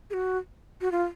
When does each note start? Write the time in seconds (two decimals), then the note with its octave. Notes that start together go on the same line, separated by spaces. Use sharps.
0.10 G#4
0.14 F#4
0.81 F#4
0.92 F4